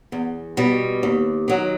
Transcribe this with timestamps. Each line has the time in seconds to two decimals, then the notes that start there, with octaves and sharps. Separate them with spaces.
0.12 E2
0.57 B2 G3
1.03 D#2
1.48 D#3 F#3